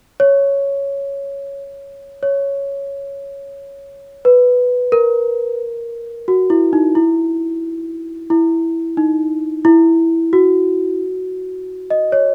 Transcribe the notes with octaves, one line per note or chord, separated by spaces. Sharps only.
C#5
C#5
B4
A#4
F#4
E4
D#4
E4
E4
D#4
E4
F#4
D#5
C#5